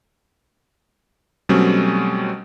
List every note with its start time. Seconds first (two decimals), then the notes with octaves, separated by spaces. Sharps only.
1.49 B2 F#3 G3 A3 C4 C#4